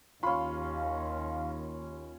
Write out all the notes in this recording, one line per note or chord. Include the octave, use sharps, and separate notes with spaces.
D#2 C#4 F4 F5 B5 C6